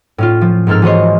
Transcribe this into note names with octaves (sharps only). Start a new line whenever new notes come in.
A2 C#4 F4
F3
G#2 A#3 C4 A4 F6
E3 F#4 G#4 C5 C#5 D#5